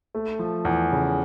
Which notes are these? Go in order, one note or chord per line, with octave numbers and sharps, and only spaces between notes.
A3
F3
E2
C#3